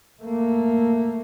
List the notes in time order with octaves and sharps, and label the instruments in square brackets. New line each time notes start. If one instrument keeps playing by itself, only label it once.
[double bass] A3 A#3